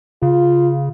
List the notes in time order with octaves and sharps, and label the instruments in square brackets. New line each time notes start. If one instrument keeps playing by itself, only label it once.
[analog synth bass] C#3 [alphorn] F4